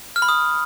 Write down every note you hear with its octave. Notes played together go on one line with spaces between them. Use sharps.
F6
B5
D#6